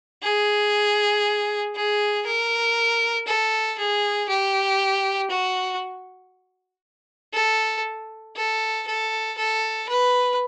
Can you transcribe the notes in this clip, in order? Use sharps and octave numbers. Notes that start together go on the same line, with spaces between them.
G#4
G#4
A#4
A4
G#4
G4
F#4
A4
A4
A4
A4
B4